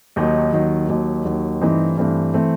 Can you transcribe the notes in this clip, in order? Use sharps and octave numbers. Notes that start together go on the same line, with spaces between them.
D#2 D#3 F#3 D#4
D#2 D#3 F#3
D#2 D#3 F#3
D#2 D#3 F#3
G2 E3 A3 C4 D#4
G2 E3 A3 C4
E3 A3 C4